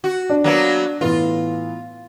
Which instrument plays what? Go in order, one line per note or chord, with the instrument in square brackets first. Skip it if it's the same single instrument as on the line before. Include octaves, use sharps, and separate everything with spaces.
[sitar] F#4
[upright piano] D4
[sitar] F#3 A#3 B3
[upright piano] A2 E3 B3 [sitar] F4